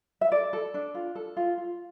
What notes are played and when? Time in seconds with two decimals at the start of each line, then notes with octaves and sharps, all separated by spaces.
0.21 E5
0.32 A4 D5
0.53 A4
0.74 D4
0.95 F4
1.15 A4
1.37 F4
1.58 F4